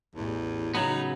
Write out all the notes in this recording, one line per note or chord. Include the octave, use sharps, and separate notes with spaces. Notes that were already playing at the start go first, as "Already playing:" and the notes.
A1 E2
C#3 F#3 B3 D#4